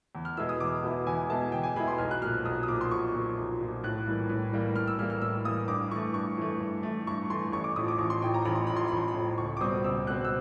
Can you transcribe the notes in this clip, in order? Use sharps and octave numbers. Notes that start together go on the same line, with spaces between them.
E2
F6
B2 G#3 B3 E4 E6
D#6
E2 D6
B2 G#3 B3 E4
E2 G#5
B2 G#3 B3 E4 A5
E2 G5
G#5
B2 G#3 B3 E4 B5
C6
B1 F6
F#6
A#2 F3 F6
B1 D#6
D#6
A#2 F3 D6
C6
B1 C#6
A#2 F3
B1
A#2 F3
A2 F#6
E3 G3 A#3
A2
E3 G3 A#3
A2 F6
E6
E3 G3 A#3 F6
F6
A2 E6
E3 G3 A#3 D#6
G2 D6
E3 A3 C#6
G2 C#6
E3 A3
G2
E3 A3
G2 C#6
E3 A3 C6
A1 C#6
D6
A2 F3 D#6
D6
A1 C#6
C6
A2 F3 G5
A#5
A1 B5
C6
A2 F3 B5
C6
A1 B5
C6
B5
A2 F3
C#2 C#6
D6
B2 G3 C4 D#6
C#2 E6
B2 G3 C4 F#6
E6